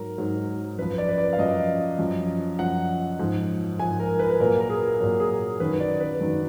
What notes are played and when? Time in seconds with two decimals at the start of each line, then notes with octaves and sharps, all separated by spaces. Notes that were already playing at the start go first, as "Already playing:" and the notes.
Already playing: G#2 F#3 A#4
0.18 G#2 F#3
0.78 F#2 F3 B4
0.98 D5
1.09 B4
1.18 D5
1.33 F5
1.39 F#2 F3 D#5
1.99 F#2 F3
2.59 F#2 F3 F#5
3.19 G#2 F3
3.79 G#2 F3 G#5
4.00 A#4
4.19 B4
4.30 B4
4.40 A#2 F#3 A#4
4.60 A#4
4.70 G#4
5.00 A#2 F#3 A#4
5.20 G#4
5.60 F#2 D#3 F#3 B4
5.80 D5
6.00 B4
6.21 F#2 D#3 F#3